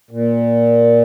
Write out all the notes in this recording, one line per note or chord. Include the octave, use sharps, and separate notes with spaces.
A#2